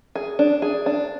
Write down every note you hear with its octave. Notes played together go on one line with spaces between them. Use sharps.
G#4
D4
G#4
D4